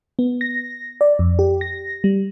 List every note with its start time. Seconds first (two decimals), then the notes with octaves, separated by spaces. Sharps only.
0.19 B3
0.41 A#6
1.01 D5
1.19 F2
1.39 G4
1.61 A#6
2.04 G3